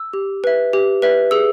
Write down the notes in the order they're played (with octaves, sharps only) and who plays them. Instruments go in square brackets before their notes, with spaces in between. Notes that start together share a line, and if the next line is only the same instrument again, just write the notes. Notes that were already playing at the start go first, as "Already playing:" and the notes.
Already playing: [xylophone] E6
G4
B4 E5
G4
B4 E5
G#4 E6